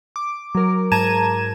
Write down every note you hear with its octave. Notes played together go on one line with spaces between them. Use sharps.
D6
F#3 A#4
G#2 A5 A#5 G#6 D#7 E7